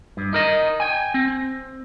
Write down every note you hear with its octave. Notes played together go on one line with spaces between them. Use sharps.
G2
D#4 A#4 D#5
G5 G#5
C4